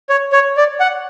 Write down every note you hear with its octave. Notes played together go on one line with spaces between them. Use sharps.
C#5
C#5
D5
F#5